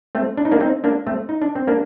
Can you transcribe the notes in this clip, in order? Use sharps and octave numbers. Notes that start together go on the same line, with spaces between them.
A3 C4
D4
D#4
A#3 D4
C4 D#4
A#3 D4
A3 C4
D#4
D4
C4
A#3 D4